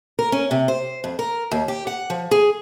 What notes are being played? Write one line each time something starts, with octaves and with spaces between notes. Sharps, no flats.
A#4
C#4
C3
C5
F2
A#4
D#2
G4
F#5
F3
G#4